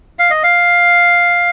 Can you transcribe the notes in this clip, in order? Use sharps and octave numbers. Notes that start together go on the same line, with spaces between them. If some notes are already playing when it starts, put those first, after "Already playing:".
F5
D#5
F5